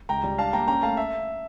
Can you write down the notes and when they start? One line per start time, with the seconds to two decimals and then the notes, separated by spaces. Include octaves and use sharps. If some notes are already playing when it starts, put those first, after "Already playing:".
0.09 C#2 G5 A#5
0.24 G3
0.38 D4 F5 A5
0.53 A#3 G5 A#5
0.68 C#4 G5 A#5
0.83 A3 F5 A5
0.97 E5